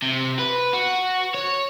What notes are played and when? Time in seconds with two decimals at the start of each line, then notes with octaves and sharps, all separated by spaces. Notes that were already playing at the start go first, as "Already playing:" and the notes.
0.02 C3
0.39 B4
0.73 F#4
1.34 C#5